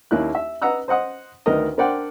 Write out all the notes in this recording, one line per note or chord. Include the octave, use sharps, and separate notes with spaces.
D#2 A#3 C#4 E4 F#6
E5
B4 D#5 F#5 A#5 E6 F#6
C5 D#5 F#5 D#6
D2 D#3 A#4 B4 D#5
D4 A#4 C5 D5 F#5 G5